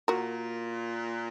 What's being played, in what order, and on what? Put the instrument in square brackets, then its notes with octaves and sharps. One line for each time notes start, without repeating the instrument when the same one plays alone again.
[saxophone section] A#2 [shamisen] F#4 A#4